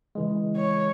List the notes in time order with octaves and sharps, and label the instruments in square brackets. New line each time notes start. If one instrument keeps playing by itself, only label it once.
[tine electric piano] C#3 E3 G#3
[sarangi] C#5